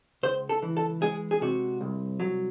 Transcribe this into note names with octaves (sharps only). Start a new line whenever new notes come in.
C#2 C5
A4
E3
A4
G#3 G#4
G#4
C3 F#4
C2
F#3